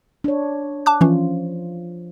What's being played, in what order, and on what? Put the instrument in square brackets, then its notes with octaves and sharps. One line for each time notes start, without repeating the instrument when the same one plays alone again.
[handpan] D4 C#5
[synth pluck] A5 D6 F#6
[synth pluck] E3 C#4 [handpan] F3 F4